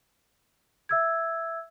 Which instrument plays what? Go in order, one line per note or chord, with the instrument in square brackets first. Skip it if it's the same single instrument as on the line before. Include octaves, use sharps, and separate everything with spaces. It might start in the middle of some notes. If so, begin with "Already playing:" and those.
[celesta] E5 E6 G#6